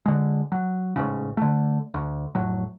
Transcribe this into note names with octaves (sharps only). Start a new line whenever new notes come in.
D3 G#3
F#3
A1 G#2 C#3
D3 A3
D2
F1 A2 F#3